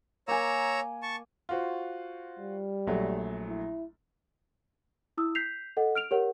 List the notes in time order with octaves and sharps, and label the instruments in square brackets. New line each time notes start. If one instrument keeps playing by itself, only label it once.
[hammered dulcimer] A#3 G#5 [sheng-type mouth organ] C#5 A#5 E6
[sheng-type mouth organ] A5 C#6
[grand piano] F4 F#4 C5
[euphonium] G3
[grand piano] A#1 F#3 A3
[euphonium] E4
[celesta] E4 D#6 E6
G6 B6 C7 F7
A4 D#5 F#5
F6 D7 F7
G4 A#4 C#5 F#5